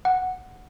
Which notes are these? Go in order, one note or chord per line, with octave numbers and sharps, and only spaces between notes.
F#5